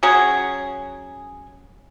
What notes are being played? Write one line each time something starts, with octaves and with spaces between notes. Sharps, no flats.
F#3 C#4 G#4